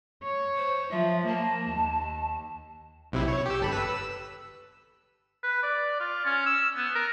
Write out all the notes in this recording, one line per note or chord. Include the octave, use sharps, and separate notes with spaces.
C#5
C5
F3 E5
A#3 A5
D#2
B1 C3 E4
C#5
G4 E6
G1 A4 B5
B4 E6 B6
E6
B4
D5
F4
C#4
E6
B3
A#4